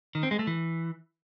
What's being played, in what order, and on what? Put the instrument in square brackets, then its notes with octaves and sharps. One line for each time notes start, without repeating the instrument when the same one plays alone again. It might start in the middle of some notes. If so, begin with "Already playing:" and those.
[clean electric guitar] D#3
C4
G#3
A3
E3